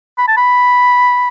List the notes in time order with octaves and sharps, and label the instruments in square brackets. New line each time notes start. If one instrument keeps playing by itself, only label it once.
[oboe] B5
A5
B5